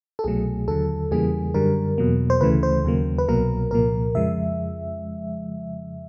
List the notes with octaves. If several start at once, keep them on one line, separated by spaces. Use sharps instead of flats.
A4
C2 B2 F#3 A3 G#4
D#2 D3 F#3 A4
E2 C#3 E3 G3 A#3 G#4
F#2 D3 G3 A#4
E2 B2 F#3 A#3
C5
D2 C#3 E3 A3 B4
C5
D#2 C#3 F#3 A#3
B4
C2 B2 F#3 A#3 A#4
C2 A#2 F3 A#3 A#4
F2 C#3 F3 G#3 E5